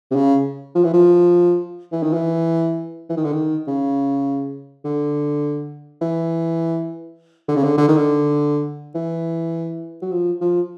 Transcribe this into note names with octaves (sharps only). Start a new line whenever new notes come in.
C3
C#3
F3
E3
F3
E3
D#3
E3
E3
D#3
D3
D#3
C#3
D3
E3
D3
C#3
D3
D3
D#3
D3
E3
F#3
F3
F3